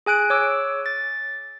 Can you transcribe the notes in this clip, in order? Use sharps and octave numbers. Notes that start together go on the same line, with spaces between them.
G#4 G#5 F#6 D7
C#5 D6 E6
A6